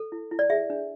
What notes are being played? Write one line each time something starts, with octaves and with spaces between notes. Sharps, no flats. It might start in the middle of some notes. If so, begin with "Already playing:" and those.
Already playing: A4
E4
E4
D5
G#4 E5
D4